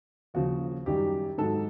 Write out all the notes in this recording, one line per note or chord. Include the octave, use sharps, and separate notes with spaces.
D#2 C#3 F3 F#4
F#2 D#3 G3 G4
G#2 D#3 F#3 A4